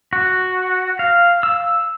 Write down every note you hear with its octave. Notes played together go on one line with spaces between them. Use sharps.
F#4
F5
E6